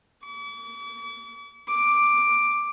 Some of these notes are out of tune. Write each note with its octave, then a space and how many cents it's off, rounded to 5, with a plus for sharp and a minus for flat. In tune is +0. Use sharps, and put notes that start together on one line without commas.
D6 -45
D6 +5